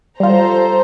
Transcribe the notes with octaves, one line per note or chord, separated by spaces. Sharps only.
G3 F4 A4 C5 A#5